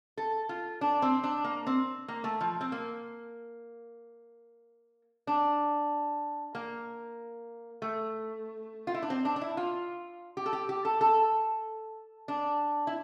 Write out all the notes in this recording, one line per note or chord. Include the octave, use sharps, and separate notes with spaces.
A4
F4
D4
C4
D4
A#3
C4
A#3
A3
F3
C4
A#3
D4
A#3
A3
F4
E4
D4
C4
D4
D4
E4
F4
G4
A4
G4
G4
A4
A4
D4
E4